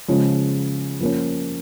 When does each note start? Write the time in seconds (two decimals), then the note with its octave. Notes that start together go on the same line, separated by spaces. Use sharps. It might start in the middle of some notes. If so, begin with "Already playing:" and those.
0.08 C#3 F3 G#3 C#4
1.00 F3 A#3 C#4